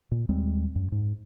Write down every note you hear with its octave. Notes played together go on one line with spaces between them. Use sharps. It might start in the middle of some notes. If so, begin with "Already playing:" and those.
A#2
D#2 G3 G#3 C4
F#2
G#2